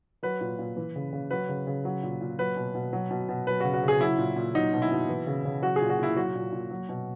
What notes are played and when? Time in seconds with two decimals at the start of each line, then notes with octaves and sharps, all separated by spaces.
0.23 F#3 B4
0.41 A#2
0.59 A#2
0.77 E3
0.96 C#3
1.13 C#3
1.31 F#3 B4
1.49 C#3
1.67 C#3
1.85 F#3
2.03 A#2
2.21 A#2
2.39 F#3 B4
2.57 B2
2.75 B2
2.93 F#3
3.11 B2
3.29 B2
3.47 F#3 B4
3.60 C#3 F#4
3.74 F#4
3.83 C#3 G#4
4.00 F#3 E4
4.18 A#2
4.36 A#2
4.54 F#3 D#4
4.74 B2
4.82 E4
4.91 B2
5.09 E3
5.27 C#3
5.45 C#3
5.62 F#3 F#4
5.76 G#4
5.81 A#2
5.90 F#4
5.99 A#2 E4
6.16 F#3 F#4
6.35 A#2
6.52 A#2
6.71 F#3
6.89 B2